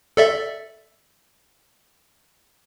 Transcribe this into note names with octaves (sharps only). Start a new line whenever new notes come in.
A4 D5 E5